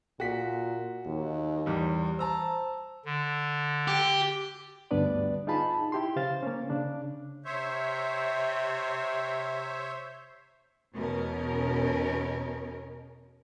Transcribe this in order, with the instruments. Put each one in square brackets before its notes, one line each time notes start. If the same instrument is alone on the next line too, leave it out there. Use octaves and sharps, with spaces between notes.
[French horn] A#2 [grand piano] F#4 B6
[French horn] D#2
[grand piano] E2 G3
[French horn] C5 [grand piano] A5 A#5 E6
[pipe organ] D3
[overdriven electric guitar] G4
[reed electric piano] D2 G2 B3 D4 B4 D5
D#4 F4 G#4 A5 B5
E4 G4 C6
C#3 C5 F5 A6
A#3 C#4
C#3 D4
[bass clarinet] C3 [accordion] C5 C#5 E5
[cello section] E2 B2 C#4 A#4